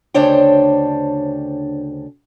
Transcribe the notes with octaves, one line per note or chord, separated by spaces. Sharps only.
D2 C#3 D4 C5 C#5 G5